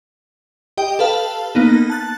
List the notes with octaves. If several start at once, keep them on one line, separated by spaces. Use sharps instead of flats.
G4 D#5 G5
A4 B4 F5 A5
A#3 B3 D#4
A5 F#6 A6